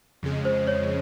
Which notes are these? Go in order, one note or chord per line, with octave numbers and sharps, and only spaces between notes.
F2 C#3 G#3
C5
C#5